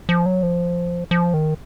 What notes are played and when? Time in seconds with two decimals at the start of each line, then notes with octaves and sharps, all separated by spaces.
0.09 F3
0.26 F#3
0.43 F3
1.11 F3
1.34 D#3